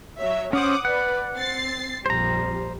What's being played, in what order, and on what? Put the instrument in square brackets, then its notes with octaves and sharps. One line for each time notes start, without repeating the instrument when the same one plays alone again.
[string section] F#3 C#5 E5
[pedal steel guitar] C#4 C5 [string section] F#5 D6 D#6
[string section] B4 D5 [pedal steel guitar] F#5
[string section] C4 A6 C7
[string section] A#1 F2 G3 [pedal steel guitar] C5 A#5